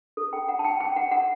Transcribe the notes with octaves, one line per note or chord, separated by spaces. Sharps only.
A4
G5
F#5
A5
G5
G5
F#5
F#5